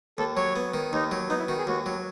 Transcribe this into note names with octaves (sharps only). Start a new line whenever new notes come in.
D#2 A4
F#3 C#5
B3
D#3
D#2 D#4
F#3
B3 D#4
E4
D#3 F#4
G#4
D#2 F#4
F#3